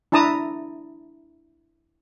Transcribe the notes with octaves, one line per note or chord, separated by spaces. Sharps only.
D4 E4 A5 A#5 D#6